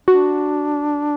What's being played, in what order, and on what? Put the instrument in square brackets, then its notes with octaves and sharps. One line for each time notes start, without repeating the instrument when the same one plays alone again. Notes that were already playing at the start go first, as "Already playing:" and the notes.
[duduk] D4 [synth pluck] F#4